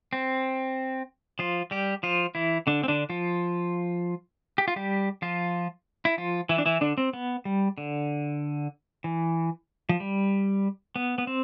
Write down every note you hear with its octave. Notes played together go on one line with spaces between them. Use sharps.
C4
F3 F4
G3 G4
F3 F4
E3 E4
D3 D4
C4
D3 D4
F3 F4
G4
F4
G3 G4
F3 F4
E4
F3 F4
E3 E4
D4
E3 E4
D3 D4
C4
B3
G3
D3
E3
F3
G3
B3
B3
C4